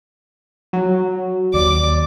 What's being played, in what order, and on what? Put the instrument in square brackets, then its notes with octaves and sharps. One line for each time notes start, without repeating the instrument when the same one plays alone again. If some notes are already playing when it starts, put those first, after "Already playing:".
[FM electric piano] F#3
[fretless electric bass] D#2 [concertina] D5 [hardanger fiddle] D6